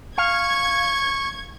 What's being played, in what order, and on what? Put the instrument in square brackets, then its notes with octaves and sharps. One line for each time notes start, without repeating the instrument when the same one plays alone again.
[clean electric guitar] F5 [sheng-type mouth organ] C#6 [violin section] G#6